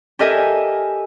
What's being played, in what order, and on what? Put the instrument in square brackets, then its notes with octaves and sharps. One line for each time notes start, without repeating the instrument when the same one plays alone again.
[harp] G4 A4 A#4 D#5 E5 G#5